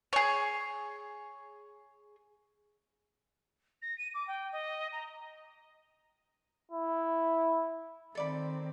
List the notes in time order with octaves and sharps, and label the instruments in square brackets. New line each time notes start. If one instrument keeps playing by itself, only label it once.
[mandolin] G#4 C#5
[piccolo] A#6
D#7
D6
G5
D#5
A#5
[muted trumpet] E4
[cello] D#3 C4 [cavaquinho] A4 D5 B5